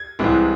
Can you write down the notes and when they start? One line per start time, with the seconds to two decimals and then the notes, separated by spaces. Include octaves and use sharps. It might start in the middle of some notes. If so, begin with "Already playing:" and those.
Already playing: G#6
0.19 C2 C3 E3 G#3